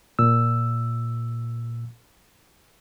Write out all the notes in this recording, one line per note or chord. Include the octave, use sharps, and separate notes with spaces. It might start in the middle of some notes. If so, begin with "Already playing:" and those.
A#2 E6